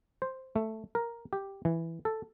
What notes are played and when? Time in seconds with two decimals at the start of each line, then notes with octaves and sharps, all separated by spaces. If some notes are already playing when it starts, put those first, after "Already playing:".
0.22 C5
0.56 A3
0.95 A#4
1.33 G4
1.65 E3
2.05 A4